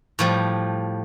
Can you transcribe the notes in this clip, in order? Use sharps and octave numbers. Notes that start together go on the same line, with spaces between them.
A2 F3 G3